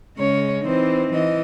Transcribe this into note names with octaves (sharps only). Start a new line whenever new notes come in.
C#3 G#3 C#4 C#5
E3 C4 D#4 C5
E3 D#5